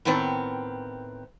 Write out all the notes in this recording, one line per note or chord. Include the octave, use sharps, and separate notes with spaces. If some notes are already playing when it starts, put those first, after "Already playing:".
A2 D#3 B3 C4